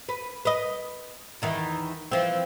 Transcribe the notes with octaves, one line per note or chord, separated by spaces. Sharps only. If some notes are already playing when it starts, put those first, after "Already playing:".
B4
B4 D#5
E2 D#3 E3
E3 F3 C4